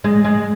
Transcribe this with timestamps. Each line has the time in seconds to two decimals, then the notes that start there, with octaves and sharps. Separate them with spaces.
0.04 G#3
0.24 G#3